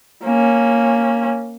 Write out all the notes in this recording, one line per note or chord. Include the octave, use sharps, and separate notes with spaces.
A#3 C#4